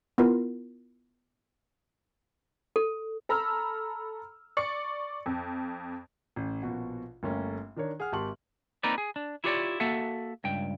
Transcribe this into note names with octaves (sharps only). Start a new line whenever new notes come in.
B3 E4 F4 A#4
A4
A4 A#5 B5 E6 F6
D5 C#6 C#7
F2
A1
A#1 B2 F#4
G1 A3 A#3 C#4
D#3 D4 A#4 C#5
G#4 F#5 F6
G#1 G4 A5 C6 C#6 F#7
A#3 C4 D#4 A#4 B4 D5
G#4
D4
E4 F4 G4 B4 C#5 D5
A#3 F#4 A4 E5 F#5
C#2 G2 G5